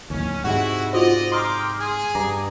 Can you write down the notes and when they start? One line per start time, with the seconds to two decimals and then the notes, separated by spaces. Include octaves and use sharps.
0.10 D1 D#2 C#4
0.44 G#2 C3 G#3 E4 F#4 F#5
0.93 F4 F#4 C5 D5 D#5
1.32 G5 A#5 C6 D6 D#6 F6
1.79 G#4
2.15 G2 A#5 D6